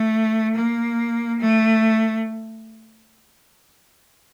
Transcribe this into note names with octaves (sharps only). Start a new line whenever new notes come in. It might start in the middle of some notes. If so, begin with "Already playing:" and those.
Already playing: A3
A#3
A3